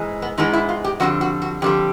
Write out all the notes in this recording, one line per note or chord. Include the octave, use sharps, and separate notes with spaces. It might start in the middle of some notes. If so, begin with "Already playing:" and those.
Already playing: G#2 E3 G#3
B3
G#2 E3 G#3 B3 D#4
E4
F4
G4
F2 D3 G3 F#4
F#4
F#4
F2 D3 G3 G4